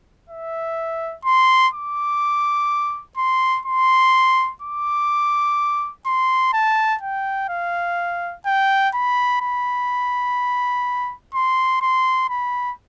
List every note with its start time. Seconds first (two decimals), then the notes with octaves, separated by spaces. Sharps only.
0.29 E5
1.25 C6
1.73 D6
3.17 C6
3.66 C6
4.62 D6
6.06 C6
6.53 A5
7.01 G5
7.49 F5
8.46 G5
8.94 B5
9.41 B5
11.34 C6
11.81 C6
12.29 B5